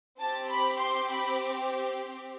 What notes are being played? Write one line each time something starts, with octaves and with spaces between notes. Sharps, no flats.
C4 G4 A5
B5
C6
B5